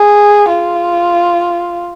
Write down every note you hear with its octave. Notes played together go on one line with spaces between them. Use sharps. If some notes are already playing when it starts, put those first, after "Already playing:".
Already playing: G#4
F4